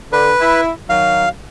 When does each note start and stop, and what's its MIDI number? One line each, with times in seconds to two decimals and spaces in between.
0.13 0.32 50
0.13 0.61 71
0.41 0.71 64
0.89 1.26 51
0.89 1.26 54
0.89 1.29 77